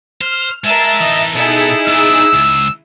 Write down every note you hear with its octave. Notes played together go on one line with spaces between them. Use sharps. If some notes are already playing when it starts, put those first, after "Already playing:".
C5 F6
G#3 A#4 E5 A5 A6
E3 D#4 D#5
B2 B3 D#4 E4 G#4 A4
B3 D4 E6
C#2